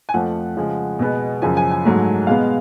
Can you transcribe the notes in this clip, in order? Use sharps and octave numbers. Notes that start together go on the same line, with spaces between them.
G#5
F2 F3 A3 F#5
C#3 F3 G#3
B2 G#3 B3
F#2 C#3 F3 G#5
G#5
G#5
G#2 F#3 A3
B2 G#3 B3 F5